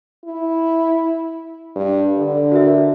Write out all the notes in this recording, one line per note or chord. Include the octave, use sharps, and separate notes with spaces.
E4
G2
D3
F#4 A#4 E5